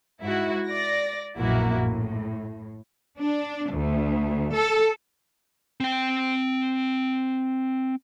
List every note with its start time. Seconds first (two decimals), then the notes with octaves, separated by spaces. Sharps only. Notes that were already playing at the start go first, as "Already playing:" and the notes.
0.21 G#2 E4 F#4
0.67 D5 A#6
1.38 A#1 F#2 B2 A#3 E4 F#4
1.84 A2
3.17 D4
3.71 D2
4.54 A4
5.80 C4 G5